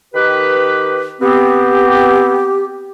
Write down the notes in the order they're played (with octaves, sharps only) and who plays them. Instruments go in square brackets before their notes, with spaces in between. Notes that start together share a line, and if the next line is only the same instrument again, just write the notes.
[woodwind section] D#3 G4 B4
[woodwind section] B3 C4 [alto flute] G4